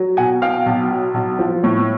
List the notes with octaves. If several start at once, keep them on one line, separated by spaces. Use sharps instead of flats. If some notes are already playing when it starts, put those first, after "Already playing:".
Already playing: F#3
B2 F#5 G#5
B3 F5 G5
B1
F#3
B1
F3
A2